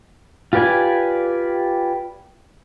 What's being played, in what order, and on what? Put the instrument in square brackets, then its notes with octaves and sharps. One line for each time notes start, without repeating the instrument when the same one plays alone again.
[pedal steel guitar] F4 G4 B4 D5 G#5